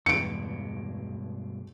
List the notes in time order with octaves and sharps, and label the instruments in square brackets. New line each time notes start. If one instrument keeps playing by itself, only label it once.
[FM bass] E2 [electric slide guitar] G2 B2 G#3 [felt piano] C#7 D7